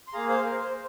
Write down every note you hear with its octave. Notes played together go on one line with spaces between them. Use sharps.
C6
A#3 G#4 F5 A#5
C5 F5
A#4
C5